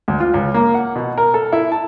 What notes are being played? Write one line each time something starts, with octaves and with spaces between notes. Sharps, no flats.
D2
F4
C#2
A#3
F#5
B2
A#4
A4
E4
A5